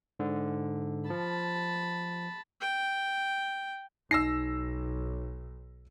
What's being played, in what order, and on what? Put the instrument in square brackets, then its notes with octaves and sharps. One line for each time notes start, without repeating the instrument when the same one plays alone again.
[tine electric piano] G#2 D3
[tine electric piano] F3 [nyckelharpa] A5 B5
[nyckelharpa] G5
[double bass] B1 [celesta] D#4 [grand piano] E6 A#6 C7